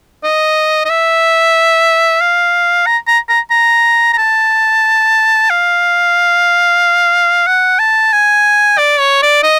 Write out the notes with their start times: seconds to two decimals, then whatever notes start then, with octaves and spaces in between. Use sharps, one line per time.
0.24 D#5
0.85 D#5
0.90 E5
2.21 F5
2.87 A#5
3.08 A#5
3.29 A#5
3.51 A#5
4.13 A#5
4.18 A5
5.50 F5
7.47 F#5
7.79 A5
8.12 G#5
8.78 D5
9.00 C#5
9.23 D5
9.44 D#5